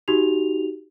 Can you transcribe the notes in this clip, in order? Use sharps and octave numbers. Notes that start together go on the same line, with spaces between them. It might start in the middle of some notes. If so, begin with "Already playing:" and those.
D#4 F#4 G4 F7